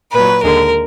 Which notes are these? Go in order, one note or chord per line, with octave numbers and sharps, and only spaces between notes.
A#2 F#3 B4
D#2 D3 G#3 A#4